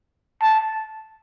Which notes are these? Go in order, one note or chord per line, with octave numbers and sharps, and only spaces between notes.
A5